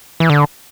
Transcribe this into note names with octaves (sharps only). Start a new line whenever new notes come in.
E3
D3